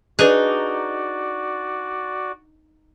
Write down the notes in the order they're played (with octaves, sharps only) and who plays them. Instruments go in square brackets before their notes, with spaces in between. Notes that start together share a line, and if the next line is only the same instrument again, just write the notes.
[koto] D4 G#4 [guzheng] D#4 [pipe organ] F#4 D5 [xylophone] B4 F#6